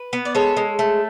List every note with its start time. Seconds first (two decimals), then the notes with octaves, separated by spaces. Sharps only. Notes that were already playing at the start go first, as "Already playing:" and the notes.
Already playing: B4
0.13 B3
0.25 D5
0.35 G#3 A4 C#5
0.57 G#3
0.79 A3